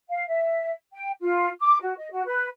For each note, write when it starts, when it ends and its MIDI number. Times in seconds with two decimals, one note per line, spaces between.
0.09 0.24 77
0.29 0.72 76
0.93 1.10 79
1.20 1.49 65
1.61 1.76 86
1.81 1.94 66
1.97 2.07 75
2.11 2.23 66
2.26 2.47 71